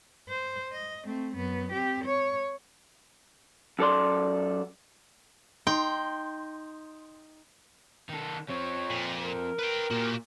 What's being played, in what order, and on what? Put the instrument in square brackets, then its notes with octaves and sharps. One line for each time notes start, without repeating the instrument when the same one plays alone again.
[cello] C5
D#5
A3 C4
F#2 B3
C4 G4
C#5
[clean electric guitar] F#2 A4 D5 C6
[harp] D#4 [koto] G5 [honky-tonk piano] C6
[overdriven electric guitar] D#3 A4
[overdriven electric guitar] F3 C4 [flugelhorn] C#5
[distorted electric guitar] A#2
[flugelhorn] A#4
[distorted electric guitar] B4 G5
[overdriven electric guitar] A#2 [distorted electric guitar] F#4 G4